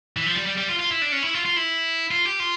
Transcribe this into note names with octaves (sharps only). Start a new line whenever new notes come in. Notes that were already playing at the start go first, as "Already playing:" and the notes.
E3
F3
G3
G3
G3
F4
F4
E4
D4
C#4
E4
F4
F4
E4
F4
G4
F4